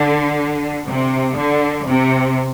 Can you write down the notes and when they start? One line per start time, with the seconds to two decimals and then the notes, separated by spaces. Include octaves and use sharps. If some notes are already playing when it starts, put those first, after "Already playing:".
Already playing: D3
0.86 C3
1.37 D3
1.88 C3